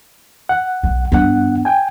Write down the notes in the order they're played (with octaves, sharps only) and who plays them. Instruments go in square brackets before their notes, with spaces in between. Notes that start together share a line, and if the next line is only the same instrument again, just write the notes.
[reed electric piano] F#5
[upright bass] B1
[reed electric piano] G2 F#5 [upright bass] B3 D4
[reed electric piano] G5 G#5